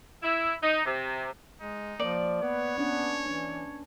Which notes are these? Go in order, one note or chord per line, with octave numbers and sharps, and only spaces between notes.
E4
D#4
C3
G#3 D#4
F3 A#3 D5
B3 B4 C#5
B3 C#4 D4
E3 D4